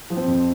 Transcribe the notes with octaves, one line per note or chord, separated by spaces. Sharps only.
F3
C4
F2